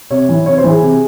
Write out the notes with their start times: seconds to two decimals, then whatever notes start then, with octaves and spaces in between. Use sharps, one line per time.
0.11 C3 C#5
0.29 E3
0.46 C3 C#5
0.58 C5
0.64 E3
0.69 G#4
0.82 C3